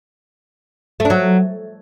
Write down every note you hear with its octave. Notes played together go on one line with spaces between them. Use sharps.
A3
D4
F#3